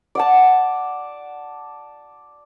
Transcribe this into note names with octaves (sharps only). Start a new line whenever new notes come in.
D5 F#5 A5